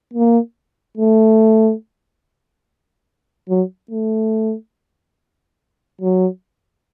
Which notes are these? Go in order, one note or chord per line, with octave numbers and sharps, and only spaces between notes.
A#3
A3
F#3
A3
F#3